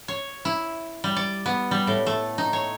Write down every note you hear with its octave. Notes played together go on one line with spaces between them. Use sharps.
C#5
E4
G3
D5
B3
G3
A2
A3
D#4
C#5